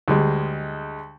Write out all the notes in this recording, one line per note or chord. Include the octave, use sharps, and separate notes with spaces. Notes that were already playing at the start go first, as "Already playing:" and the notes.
D2 G3 G#3